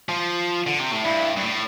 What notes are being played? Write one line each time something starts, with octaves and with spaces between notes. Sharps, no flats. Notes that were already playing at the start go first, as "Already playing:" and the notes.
F3
D3
C3
A2
G2 E4
G2
A2